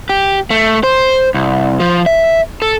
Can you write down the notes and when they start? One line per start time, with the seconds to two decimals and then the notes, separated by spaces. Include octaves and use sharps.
0.09 G4
0.50 A3
0.83 C5
1.34 C2
1.80 F3
2.06 E5
2.62 A4